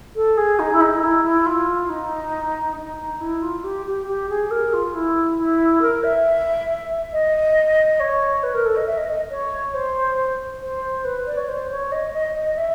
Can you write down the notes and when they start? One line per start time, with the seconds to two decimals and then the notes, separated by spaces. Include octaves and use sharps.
0.15 A4
0.37 G#4
0.59 D#4
0.72 E4
0.81 D#4
1.03 E4
1.24 E4
1.46 F4
1.89 D#4
2.76 D#4
3.20 E4
3.42 F4
3.63 G4
3.85 G4
4.07 G4
4.29 G#4
4.50 A#4
4.73 F4
4.94 E4
5.38 E4
5.81 A#4
6.03 E5
7.12 D#5
7.99 C#5
8.43 B4
8.54 A#4
8.65 A4
8.76 D#5
8.86 E5
8.97 D#5
9.08 D#5
9.30 C#5
9.74 C5
10.61 C5
11.04 B4
11.26 D5
11.37 C#5
11.48 C5
11.70 C#5
11.91 D#5
12.13 D#5
12.35 D#5
12.57 E5